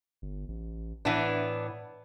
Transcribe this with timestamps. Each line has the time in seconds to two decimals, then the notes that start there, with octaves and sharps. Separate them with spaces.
0.22 G1
0.48 A1
1.05 A2 E3 B3 D4